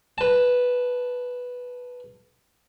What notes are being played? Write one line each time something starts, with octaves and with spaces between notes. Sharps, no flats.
B4 A5